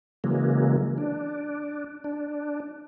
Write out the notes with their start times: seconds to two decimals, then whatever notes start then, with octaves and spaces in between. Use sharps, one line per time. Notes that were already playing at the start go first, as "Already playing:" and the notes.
0.24 C#3 E3 F#3 G#3 A#3
0.98 D4
2.04 D4